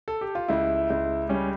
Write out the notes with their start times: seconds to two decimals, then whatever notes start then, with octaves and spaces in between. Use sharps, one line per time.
0.08 A4
0.21 G4
0.35 F4
0.48 C#2 E4
0.90 C#2
1.29 G3 C#4